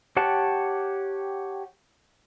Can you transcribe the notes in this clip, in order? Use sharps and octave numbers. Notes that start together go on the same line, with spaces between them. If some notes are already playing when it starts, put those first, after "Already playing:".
G4 C#5 F#5 G5 A5